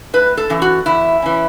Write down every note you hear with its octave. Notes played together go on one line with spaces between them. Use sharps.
A2 B4
A4
E3 C#4
F#4
E2 E4
E3 C#4